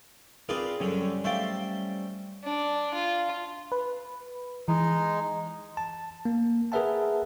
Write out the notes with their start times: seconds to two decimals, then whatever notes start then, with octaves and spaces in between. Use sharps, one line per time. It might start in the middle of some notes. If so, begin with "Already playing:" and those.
0.49 C4 F4 G#4 A#4 B4 D5
0.80 F#2 D3 G3 C#4
1.24 A3 C5 D5 E5 F5 G5
2.44 D4
2.94 F4
3.72 B4
4.68 E3 G#3 D#4
5.77 A5
6.25 A#3
6.72 G#4 A#4 B4 E5 F#5 A5